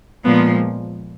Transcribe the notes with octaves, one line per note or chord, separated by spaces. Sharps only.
A#2 F3 G#3 B3